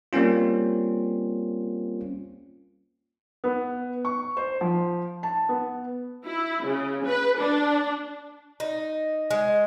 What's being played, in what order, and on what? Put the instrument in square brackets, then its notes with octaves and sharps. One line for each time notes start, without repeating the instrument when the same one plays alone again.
[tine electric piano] G3 A#3 C4 C#4 F4
[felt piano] B3
C#6
C5
F3
A5
B3
[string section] E4
C#3
B4
D4
[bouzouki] D#4
G#3